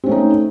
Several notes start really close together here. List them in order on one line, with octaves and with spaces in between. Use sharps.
C4 C#4 A3 D#4